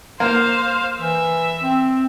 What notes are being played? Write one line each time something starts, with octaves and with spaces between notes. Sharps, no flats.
A#3 C5 F5
E3 E5
C4